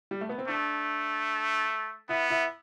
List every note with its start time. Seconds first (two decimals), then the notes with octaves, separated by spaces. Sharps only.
0.11 G3
0.21 A3
0.29 B3
0.38 C4
0.48 A3 D4
2.09 B3 E4
2.30 E4